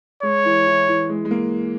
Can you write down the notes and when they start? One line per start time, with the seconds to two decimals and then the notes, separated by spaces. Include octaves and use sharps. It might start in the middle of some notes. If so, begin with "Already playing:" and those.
0.23 G#3 C#5
0.45 E3
0.67 E3
0.88 E3
1.09 G#3
1.25 G#3
1.31 A#3